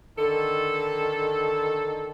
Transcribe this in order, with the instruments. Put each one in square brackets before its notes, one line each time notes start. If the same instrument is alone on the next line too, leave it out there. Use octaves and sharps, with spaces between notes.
[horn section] D3 D#3 A4